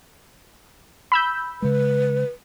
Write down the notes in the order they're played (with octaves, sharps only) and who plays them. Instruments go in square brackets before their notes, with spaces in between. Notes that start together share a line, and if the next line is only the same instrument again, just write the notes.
[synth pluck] B5 E6 G6
[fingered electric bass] C#3 G#3 [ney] B4